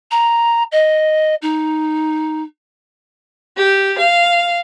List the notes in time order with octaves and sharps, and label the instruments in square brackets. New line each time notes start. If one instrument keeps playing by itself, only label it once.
[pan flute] A#5
D#5
D#4
[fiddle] G4
F5